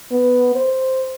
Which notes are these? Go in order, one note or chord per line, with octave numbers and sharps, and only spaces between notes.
B3
C5